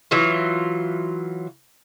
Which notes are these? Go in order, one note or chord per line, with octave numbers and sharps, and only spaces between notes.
E3 F#3 F4